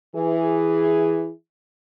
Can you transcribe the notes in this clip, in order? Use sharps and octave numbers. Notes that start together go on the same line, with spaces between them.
E3 G#4